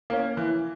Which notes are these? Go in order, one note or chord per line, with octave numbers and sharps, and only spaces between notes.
A#3 C#4
E3